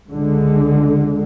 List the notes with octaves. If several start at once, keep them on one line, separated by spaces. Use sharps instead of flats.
C#2 D3 G#3